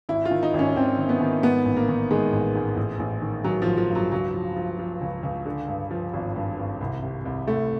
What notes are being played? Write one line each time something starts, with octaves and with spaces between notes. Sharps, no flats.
G#1 E4
F4
D#3
D#4
G#1
C#4
G#1 C4
D#3
B3
D#3
G#2 B3
A1
A#3
D#3
D#3 G#3
A1
G#2
A1
A1
D#3
D#3 F#3
F3
A1
F3
G2
F#3
C#2 F#3
F3
F3
F3
C#2
C#2
D3
G2
F3
G#1
G2
G#1
C2
C3
C2
C2 A3